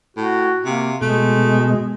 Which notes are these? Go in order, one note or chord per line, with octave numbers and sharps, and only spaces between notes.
A2 F#4
C3 A#3
B2 G#3 A3